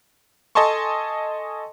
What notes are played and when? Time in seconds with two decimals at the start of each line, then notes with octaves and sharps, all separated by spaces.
0.55 A4 D#5 G#5 A5 C6 C#6